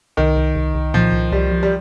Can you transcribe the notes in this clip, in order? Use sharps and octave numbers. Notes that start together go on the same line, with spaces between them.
C2 D#3
C2
C2
C2
A#2 F3
C2
C2 G3
F3
G3